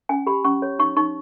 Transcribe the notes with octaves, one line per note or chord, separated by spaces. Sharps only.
C#4 G#5
G4 B5
C#4 C#6
C#5
D#4 C#6
D#4 C#6